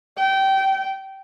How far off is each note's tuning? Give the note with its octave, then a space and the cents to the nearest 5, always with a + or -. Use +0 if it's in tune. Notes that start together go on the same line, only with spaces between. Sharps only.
G5 -20